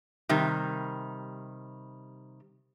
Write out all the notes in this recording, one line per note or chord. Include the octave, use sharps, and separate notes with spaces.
C3 D#3 G3